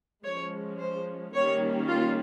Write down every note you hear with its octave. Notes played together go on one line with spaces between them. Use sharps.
F3 G#3 C#4 C#5
C5
D#3 G3 A#3 C#4 C#5
F4